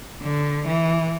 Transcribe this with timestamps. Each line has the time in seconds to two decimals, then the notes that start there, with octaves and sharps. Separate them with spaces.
0.22 D3
0.67 E3